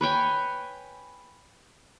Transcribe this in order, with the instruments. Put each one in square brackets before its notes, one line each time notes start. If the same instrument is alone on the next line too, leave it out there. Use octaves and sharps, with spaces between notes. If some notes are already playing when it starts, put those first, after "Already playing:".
[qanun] B4 C#5 G5 G#5